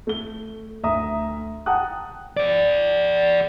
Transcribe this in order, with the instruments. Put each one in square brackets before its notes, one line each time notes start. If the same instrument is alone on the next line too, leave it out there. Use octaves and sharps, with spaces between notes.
[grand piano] A3 G7
D2 E5 A#5 D#6
F#5 G5 A5 A#5 D#6 F#6
[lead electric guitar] G#4 D5